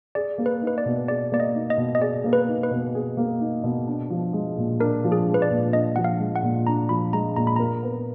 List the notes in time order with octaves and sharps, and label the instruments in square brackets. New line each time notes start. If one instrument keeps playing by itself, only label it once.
[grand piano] G#4 [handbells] D5
[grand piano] A#3
[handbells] B4
[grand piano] D#4
[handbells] B4
D5
[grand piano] B2
[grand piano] G#4 [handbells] D5
[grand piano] A#3 [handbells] D5
[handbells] D#5
[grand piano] D#4
[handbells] D#5
[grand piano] B2
[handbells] D#5
[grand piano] G#4 [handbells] D5
[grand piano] A#3
[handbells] B4
[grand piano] D#4
[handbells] B4
[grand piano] B2
G#4
A#3
D#4
B2
D4
F3
G#3
A#2
[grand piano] D4 [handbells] A#4
[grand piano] F3
[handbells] G#4
[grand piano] G#3
[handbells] B4
D5
[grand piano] A#2
[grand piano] D4 [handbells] D#5
[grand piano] F3 [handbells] F#5
[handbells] F5
[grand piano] G#3
[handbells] F#5
[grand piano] A#2
[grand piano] D4 [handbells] A#5
[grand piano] F3 [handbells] B5
[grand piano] G#3 [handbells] A#5
[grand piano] A#2 [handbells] A#5
[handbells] B5
[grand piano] A#4 [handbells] A#5
[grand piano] B3